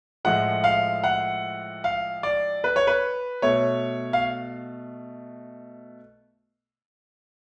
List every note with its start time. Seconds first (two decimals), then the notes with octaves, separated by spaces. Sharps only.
0.25 A2 F3 G#3 F#5
0.64 F5
1.04 F#5
1.84 F5
2.23 D5
2.64 B4
2.76 C#5
2.87 B4
3.42 B2 A3 C#5
4.13 F5